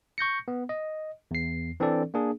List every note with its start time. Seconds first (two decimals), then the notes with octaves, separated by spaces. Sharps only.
0.18 C#6 G6 A#6 C#7
0.48 B3
0.69 D#5
1.31 E2 C7
1.80 E3 C4 D4 A4 D5
2.14 A#3 D4 G#4